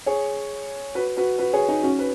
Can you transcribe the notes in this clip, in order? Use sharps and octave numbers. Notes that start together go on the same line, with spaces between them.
G#4 C#5
F#4 B4
F#4 B4
F#4 B4
G#4 C#5
D#4 G#4
C#4 F#4
B4